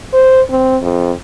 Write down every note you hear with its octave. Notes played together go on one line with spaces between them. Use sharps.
C5
C4
F2